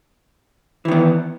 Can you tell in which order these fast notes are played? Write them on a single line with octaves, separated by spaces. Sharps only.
E3 D#3 B3